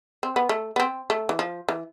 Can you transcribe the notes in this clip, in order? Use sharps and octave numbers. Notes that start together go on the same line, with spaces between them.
C4
B3
A3
B3
C4
A3
E3
F3
E3